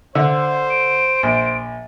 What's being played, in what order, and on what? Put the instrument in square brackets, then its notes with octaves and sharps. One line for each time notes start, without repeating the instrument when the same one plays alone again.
[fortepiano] D3 [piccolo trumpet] C5 [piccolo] E5
[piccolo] D7
[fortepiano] A#1